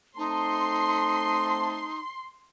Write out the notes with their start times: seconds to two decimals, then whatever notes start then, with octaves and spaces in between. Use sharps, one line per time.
0.18 A3 C4 D#4 A5 C6